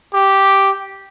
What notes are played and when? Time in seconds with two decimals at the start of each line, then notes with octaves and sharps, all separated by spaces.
0.14 G4